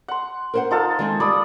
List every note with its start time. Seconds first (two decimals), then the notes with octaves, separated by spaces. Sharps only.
0.08 F#5 C6
0.54 A#4 C5 F#5
0.71 D#4 F4 A4
0.99 D#3 G#3 C4
1.20 G3 D5 B5 D#6